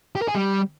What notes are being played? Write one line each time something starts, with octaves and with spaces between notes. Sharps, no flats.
G4
A#4
G#4
G3